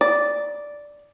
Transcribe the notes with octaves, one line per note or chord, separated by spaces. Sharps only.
D5